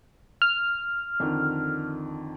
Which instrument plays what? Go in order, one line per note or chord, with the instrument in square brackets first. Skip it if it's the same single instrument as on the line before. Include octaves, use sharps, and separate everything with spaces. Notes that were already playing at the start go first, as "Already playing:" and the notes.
[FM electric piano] F6
[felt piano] F2 D3 D#3